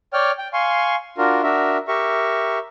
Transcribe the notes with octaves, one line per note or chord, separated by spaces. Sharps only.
C#5 D5 G5 F6
G5
F5 G#5 C6 C#6
D4 F4 F#4 A#4
D4 F#4 A#4 E5
G4 A#4 E5 C#6